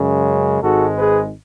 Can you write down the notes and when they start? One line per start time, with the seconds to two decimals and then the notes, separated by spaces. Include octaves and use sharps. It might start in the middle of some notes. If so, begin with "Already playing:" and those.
Already playing: F#2 C#3 G#3
0.61 G#1 G#2 G#3 F#4 A4
0.96 G#4 B4